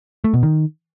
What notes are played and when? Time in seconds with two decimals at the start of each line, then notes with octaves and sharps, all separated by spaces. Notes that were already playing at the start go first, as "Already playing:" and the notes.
0.24 A3
0.34 B2
0.43 D#3